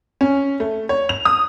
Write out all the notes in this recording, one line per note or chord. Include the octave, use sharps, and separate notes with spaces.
C#4
A3
C#5
F7
D#6